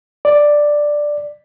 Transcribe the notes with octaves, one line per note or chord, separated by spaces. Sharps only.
D5